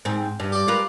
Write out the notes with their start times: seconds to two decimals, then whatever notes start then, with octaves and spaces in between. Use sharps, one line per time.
0.05 G#2 C4
0.40 G2
0.52 G4 D5
0.68 F4 A#4 B4